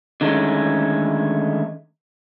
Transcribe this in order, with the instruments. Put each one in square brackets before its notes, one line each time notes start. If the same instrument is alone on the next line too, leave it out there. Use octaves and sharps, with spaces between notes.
[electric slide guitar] D3 D#3 G#3 A3 C#4